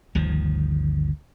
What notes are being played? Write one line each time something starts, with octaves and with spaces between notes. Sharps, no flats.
G1 D2 D#3 F3